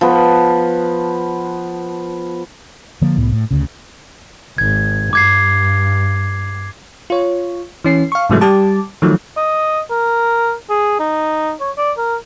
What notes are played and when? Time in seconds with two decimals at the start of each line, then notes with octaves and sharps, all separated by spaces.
0.01 F3 B3
3.02 D3 F3 A#3
3.16 C2 A2 B3
3.32 A2
3.51 D2 C#3
4.58 G#1 G#6
5.13 G2 D6 G#6 C7
7.10 F4 C#5
7.84 E3 C#4 C7
8.12 F5 C#6
8.29 G#2 C3 E3 F#3 G#3 A3
8.41 G3 G4 A5 D6
9.02 D#3 F3 F#3 A3
9.37 D#5
9.90 A#4
10.70 G#4
10.99 D#4
11.60 C#5
11.77 D5
11.98 A#4